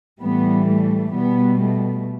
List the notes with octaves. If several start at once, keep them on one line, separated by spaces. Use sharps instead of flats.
A2 E3 G3 B3
A3
B2 G3 B3
A3